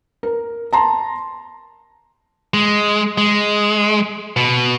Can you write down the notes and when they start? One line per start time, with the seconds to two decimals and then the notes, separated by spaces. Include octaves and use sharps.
0.23 A#4
0.73 A5 A#5 C6
2.54 G#3
3.18 G#3
4.37 B2